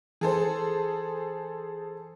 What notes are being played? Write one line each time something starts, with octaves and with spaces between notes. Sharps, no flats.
E3 G#4 A4 C5